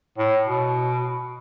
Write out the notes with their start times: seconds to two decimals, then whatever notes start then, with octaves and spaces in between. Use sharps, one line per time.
0.18 A2
0.47 B2